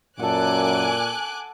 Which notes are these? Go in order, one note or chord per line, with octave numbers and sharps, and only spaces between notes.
F#2 A#2 A4 F#5 G#5 D6 F#6